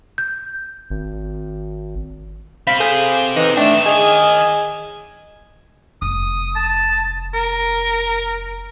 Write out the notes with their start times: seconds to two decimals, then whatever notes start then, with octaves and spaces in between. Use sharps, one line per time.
0.18 G6
0.90 G#1
2.67 C4 G4 F5 B5
2.80 G#4 A4 G6
3.36 E3 D#4
3.57 D#3 A3 D4 E5 G5 A5
3.86 G#4 D#5 G#5
6.02 F1 D#6
6.56 A5
7.34 A#4